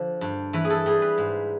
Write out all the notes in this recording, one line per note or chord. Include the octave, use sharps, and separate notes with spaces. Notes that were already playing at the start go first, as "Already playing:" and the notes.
Already playing: D3 F3 C5
G2
E3 B4
G#4
A4
G3 G#4
B4
G#2